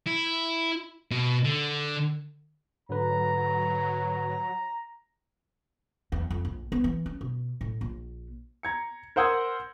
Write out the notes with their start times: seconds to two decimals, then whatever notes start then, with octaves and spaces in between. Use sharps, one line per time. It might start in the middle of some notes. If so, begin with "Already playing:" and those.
0.07 E4
1.11 B2
1.44 D3
2.89 G#2 D3 F#3 B4 A#5
6.12 E2
6.30 F2
6.45 A#1
6.72 B3
6.84 E3
7.06 C#4
7.21 B2
7.61 A2
7.81 A#1
8.63 A#5 G#6 C#7
9.16 A#4 C5 F#5 D#6 E6 G#6